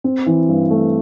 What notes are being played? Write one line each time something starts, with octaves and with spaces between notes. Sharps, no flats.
C4
E3
G2
A3